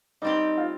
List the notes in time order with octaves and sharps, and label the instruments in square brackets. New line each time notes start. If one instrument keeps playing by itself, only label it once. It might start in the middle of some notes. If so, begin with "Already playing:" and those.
[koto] G3 C4 G4 [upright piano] D#4
[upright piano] F4